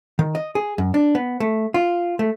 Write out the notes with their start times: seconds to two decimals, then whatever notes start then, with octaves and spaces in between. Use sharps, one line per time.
0.19 D#3
0.35 D#5
0.55 G#4
0.78 F#2
0.94 D4
1.15 B3
1.40 A3
1.74 F4
2.19 A3